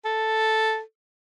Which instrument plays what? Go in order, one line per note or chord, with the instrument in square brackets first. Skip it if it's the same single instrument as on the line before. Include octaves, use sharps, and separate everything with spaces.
[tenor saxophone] A4